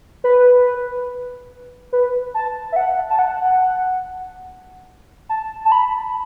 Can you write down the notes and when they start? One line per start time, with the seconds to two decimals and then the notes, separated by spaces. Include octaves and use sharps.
0.24 B4
1.93 B4
2.34 A5
2.72 E5
2.76 F#5
3.10 A5
3.19 F#5
5.29 A5
5.65 A5
5.72 B5